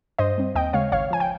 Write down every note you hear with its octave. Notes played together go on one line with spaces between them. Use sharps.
G2 C5 D#5
G3 C4
D#2 D#5 G5
C#3 G#3 C#5 F5
G#1 C#5 F5
F3 G#5
G5